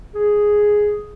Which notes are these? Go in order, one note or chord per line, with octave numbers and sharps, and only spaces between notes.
G#4